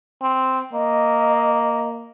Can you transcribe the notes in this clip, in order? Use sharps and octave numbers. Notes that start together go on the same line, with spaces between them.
C4
A#3 D#5